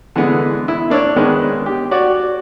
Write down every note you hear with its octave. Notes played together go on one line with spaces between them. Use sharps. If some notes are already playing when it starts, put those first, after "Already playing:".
D3 E3 G#3 B3
E4
A#3 D4 C#5 E6
D#3 G#3 B3 C#4
G4
F#4 C#5 D5